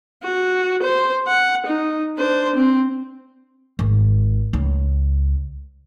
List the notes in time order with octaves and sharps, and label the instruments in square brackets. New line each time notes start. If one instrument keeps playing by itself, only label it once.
[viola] F#4
C5
F#5
D#4
D4 C5
C4
[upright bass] G#1
C#2